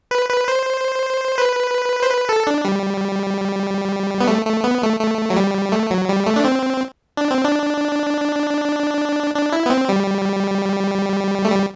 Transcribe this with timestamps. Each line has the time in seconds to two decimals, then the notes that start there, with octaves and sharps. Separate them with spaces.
0.11 B4
0.30 B4
0.48 C5
1.38 B4
2.02 C5
2.10 B4
2.29 A4
2.47 D4
2.65 G3
4.20 B3
4.27 A3
4.46 A3
4.64 B3
4.82 A3
5.00 A3
5.30 F#3
5.36 G3
5.72 A3
5.91 F#3
6.09 G3
6.27 A3
6.36 D4
6.44 C4
7.17 D4
7.31 C4
7.45 D4
9.35 D4
9.52 E4
9.66 B3
9.70 C4
9.89 G3
11.45 A3
11.52 G3